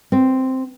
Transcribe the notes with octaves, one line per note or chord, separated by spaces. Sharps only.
C4